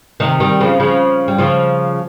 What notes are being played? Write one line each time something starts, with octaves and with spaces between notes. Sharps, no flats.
C3 D#3
D#3 G3
C#3 F3
C#3 F3
G3
C#3 F3